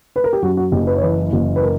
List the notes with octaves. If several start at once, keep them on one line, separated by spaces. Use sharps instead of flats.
B4
A#4
G4
F#2 F#4
F#4
F#1 G4
B4
C#5
E3 B4
F#1
B4
A#4